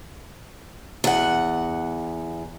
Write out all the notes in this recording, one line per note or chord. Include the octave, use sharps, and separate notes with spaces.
E2 F#5